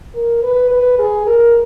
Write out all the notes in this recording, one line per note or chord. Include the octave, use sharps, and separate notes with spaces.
A#4
B4
B4
G#4
A#4